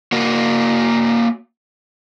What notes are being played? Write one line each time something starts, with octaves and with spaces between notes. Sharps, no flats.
A#3 F#4